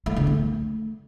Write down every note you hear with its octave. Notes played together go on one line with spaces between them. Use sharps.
A3
D3
A3